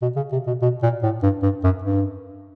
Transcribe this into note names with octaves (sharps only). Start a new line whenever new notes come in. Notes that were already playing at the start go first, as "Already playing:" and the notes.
B2
C#3
C3
B2
B2
A#2
A2
G2
G2
F#2
G2